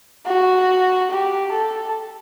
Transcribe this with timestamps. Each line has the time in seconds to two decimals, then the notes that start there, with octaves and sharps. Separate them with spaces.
0.26 F#4
1.11 G4
1.52 A4